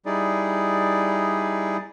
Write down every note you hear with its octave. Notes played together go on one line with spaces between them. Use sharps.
G3 D#4 E4 G#4 D5